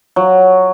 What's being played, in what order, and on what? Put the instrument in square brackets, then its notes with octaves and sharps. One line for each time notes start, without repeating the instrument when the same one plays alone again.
[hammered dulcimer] F#3